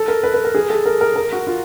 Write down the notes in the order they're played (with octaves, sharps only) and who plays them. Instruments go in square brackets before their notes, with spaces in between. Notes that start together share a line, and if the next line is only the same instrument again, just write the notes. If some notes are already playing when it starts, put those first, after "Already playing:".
Already playing: [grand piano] A4
A#4
B4
B4
A#4
G#4
A4
A#4
A#4
A#4
F#4
F4